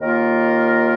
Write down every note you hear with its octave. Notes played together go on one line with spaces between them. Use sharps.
D#2 D#3 A#3 F4 A#4